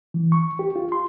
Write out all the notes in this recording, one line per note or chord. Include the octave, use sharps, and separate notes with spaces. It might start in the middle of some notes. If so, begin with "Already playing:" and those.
E3
C#6
G4
F4
C6